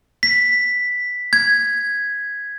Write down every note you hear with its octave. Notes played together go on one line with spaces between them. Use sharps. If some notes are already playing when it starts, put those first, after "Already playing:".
B6
G#6